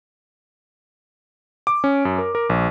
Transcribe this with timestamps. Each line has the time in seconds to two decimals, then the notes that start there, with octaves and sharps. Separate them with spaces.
1.67 D6
1.84 C#4
2.05 F#2
2.19 A#4
2.35 A#4
2.49 A#1